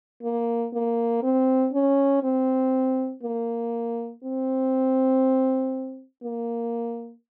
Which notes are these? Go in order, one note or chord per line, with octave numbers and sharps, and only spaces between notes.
A#3
A#3
C4
C#4
C4
A#3
C4
A#3